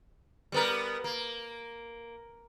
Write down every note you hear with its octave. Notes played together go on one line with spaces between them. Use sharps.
G3 B3 A#4
A#3